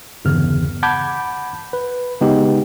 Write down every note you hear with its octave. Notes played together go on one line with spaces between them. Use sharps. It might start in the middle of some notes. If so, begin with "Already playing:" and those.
G1 E2 C#3 F6
F#5 A5 B5 D6 G6 G#6
B4
C#3 G#3 B3 D#4 G4